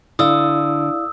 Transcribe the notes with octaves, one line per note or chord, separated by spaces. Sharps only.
D3 E4 D5 F5 D#6 E6